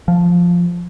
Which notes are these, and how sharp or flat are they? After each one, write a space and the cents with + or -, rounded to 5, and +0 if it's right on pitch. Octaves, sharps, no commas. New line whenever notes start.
F3 +0